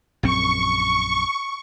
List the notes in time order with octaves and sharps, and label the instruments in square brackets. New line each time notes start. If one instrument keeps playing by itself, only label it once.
[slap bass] A#1 F#2 C4 [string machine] C#6